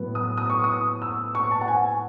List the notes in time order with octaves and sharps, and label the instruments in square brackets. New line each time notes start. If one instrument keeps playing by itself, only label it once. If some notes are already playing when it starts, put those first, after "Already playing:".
Already playing: [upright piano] A2 F#3 B3
D#6
D#6
C#6
D#6
E6
C#6
A5
F#5
G#5